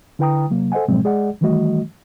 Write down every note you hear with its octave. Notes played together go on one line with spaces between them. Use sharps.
D3 E4 B4 G5 A#5 D#6
C3 F#3 A#3
A4 C5 D#5 F#5 G#5
G#2 B2 F3 F#3 G#3 C4
G#3 G#4 D5 D#5 F#5
D#3 E3 G3 A3 F#4 D#5